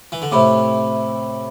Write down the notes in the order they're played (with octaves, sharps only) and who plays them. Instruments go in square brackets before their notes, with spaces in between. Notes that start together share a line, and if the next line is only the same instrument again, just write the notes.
[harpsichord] E3
D3
[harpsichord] A2 C3 [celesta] C5 E5 B5 D6